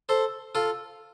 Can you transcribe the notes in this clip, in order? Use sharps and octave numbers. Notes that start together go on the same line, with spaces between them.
A4 C5
F4 A4